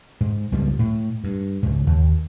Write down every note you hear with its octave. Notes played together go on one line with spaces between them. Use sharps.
G#2
C#2 G#2 F3 G3
A2
G2
C#2 G#2
D#2